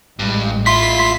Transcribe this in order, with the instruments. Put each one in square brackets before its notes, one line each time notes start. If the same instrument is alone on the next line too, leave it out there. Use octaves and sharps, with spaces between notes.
[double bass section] A1 G#3 [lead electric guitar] G2
[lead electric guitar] E4 F4 [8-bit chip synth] C6 B6